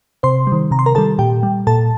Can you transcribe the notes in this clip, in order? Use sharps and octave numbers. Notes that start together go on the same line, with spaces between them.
C3 C5 C6
G3
D#3
C3 A#5
C6
A#4 A#5
D#3 G3 A4 A5
A#2 G4 G5
G3
A#2 A4 A5